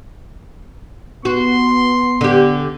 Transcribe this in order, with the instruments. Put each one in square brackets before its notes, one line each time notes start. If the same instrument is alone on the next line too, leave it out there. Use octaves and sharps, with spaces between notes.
[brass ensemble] B3 [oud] F#4 [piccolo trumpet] C6
[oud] D3 G4